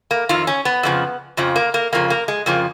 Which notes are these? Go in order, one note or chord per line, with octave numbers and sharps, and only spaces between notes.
A#3
F2 D#3 F4
C#4
B3
F2 C#3 F3
F2 C#3 F3
A#3
A#3
F2 C#3 F3 A#3
A#3
G#3
F2 C#3 F3 A#3